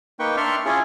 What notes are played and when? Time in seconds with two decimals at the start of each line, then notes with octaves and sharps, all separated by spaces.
0.19 A#3 D#4 B4 G5 C#6
0.37 D4 D5 E5 C6 C#6 F6
0.66 C#4 E4 F4 G#4